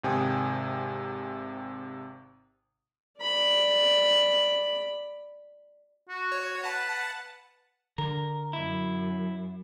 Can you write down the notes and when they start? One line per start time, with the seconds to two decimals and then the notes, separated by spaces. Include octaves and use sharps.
0.04 G#1 C3 G5 G#5 D#6
3.20 D5 B5
6.09 F#4
6.32 C#5
6.64 B4 F#5 A5
7.98 D3 A#4
8.53 F#2 E4